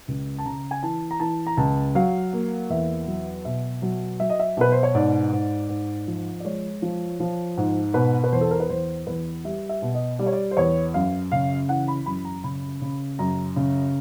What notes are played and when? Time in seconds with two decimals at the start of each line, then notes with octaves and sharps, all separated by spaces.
0.08 C#2
0.38 A5
0.46 C#3 A#5
0.71 G#5
0.83 E3 A5
1.11 A#5
1.20 E3 A5
1.47 A#5
1.57 C#2 A5
1.95 F#3 F5
2.33 A#3
2.70 E2 E5
3.07 F#3
3.45 B2 E5
3.82 F#3
4.20 F#3 E5
4.30 D#5
4.39 E5
4.57 B2 B4
4.72 C5
4.83 C#5
4.95 G#2 D5
5.32 G#2
5.69 G#2
6.07 F3
6.40 D5
6.45 G#3 C#5
6.82 F3
7.20 F3
7.57 G#2
7.94 B2 B4
8.24 B4
8.32 E2 C5
8.41 A4
8.51 A#4
8.60 B4
8.69 E2 C5
9.07 E2 B4
9.44 G3 E5
9.69 E5
9.82 B2
9.94 D#5
10.19 G3 D5
10.26 C#5
10.33 D5
10.51 C5
10.57 E2 C#5
10.94 F#2 F5
11.32 C#3 F5
11.69 E3 F#5
11.88 B5
12.06 F#2 B5
12.25 A#5
12.44 C#3 B5
12.82 C#3
13.19 F#2 A#5
13.56 C#3